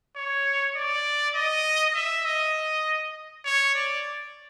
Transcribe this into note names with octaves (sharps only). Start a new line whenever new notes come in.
C#5
D5
D#5
E5
D#5
C#5
D5